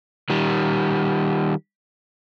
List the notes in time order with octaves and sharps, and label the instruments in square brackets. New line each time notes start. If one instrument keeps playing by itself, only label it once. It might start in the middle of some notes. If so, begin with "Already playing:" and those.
[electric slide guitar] D#3 G3